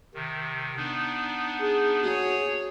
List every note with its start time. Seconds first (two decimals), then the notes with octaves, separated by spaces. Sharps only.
0.14 C3 D#3
0.76 B3 D4 D#4
1.61 G#4
2.03 F#4 G#4 C#5